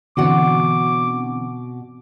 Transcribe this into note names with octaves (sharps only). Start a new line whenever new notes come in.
B2 D3 E3 C4 F#4 F#5 D6